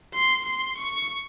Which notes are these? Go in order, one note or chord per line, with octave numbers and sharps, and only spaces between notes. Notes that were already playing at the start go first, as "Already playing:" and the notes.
C6
C6
C#6